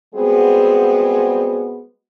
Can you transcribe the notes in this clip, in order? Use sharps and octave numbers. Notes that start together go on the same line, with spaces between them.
G3 G#3 B3 C4 F#4 G#4